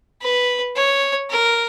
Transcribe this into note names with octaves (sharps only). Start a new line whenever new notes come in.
B4
C#5
A#4